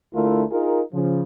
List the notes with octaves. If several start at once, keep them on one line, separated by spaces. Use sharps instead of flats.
D2 D3 A3 E4 F4 A#4
D#4 F4 G#4 A#4
C#3 F3